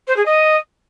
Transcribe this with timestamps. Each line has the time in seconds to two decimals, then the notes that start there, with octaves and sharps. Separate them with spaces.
0.07 C5
0.16 G#4
0.25 D#5